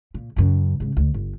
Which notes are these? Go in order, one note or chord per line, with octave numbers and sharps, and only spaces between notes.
A#2
F#2 C#3
G#2 C#3
D2
G1